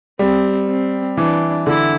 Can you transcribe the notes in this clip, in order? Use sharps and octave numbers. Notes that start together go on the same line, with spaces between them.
G3 C4
C4
E3 D4
D3 E4